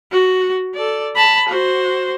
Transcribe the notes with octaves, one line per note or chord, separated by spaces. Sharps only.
F#4
A4 D5
A5 B5
F#4 C5